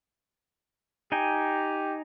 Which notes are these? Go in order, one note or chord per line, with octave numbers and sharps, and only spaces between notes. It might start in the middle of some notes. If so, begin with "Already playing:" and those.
D#4 G4 G5 G#5